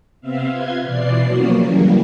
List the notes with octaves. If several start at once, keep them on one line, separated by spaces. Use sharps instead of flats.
C3 B3 C4 E5 F5
C3 F4 B4 C6 G#6
B2 E3 D5 C7
F3 F#3 A#3 B3 C#4 F#4
C#3 E3 F#3 G3 A#3